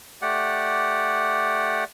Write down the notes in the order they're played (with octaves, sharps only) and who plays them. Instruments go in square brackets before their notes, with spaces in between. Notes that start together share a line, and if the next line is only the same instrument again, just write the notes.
[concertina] A3 G4 D5 F#5